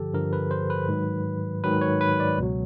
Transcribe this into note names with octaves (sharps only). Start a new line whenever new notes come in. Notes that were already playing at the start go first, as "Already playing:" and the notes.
Already playing: G2 D3 F3 G4 A4
G2 D3 F3 A#4
B4
C5
B4
G#2 D#3 F#3
G#2 D#3 F#3 B4
C#5
B4
D5
C#2 B2 F#3